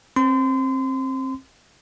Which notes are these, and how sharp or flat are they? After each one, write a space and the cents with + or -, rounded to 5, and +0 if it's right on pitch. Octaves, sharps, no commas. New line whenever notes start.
C4 +25 C6 -35